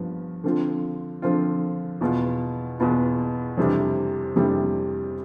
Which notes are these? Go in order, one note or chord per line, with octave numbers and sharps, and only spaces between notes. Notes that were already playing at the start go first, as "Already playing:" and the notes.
Already playing: G2 F3 B3
D3 F3 C4 F4
D3 F3 C4 F4
E2 B2 B3 F4
E2 B2 B3 F4
F2 C3 E3 G3 D4
F2 C3 E3 G3 D4